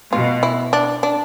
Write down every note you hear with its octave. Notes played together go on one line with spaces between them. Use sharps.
B2 F4
E4
D4
D4